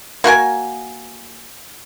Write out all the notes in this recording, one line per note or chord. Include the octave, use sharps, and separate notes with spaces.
A#3 F#4 A#4 G#5